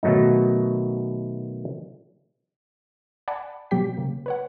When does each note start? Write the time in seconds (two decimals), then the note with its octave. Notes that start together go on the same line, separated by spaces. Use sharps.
0.03 B2 D#3 F#3 A3 D#4
3.28 D5 F#5 G#5 A5 B5
3.71 B2 F#3 G3 G4 G5 B6
3.97 C#3 A#3
4.26 B4 C#5 F#5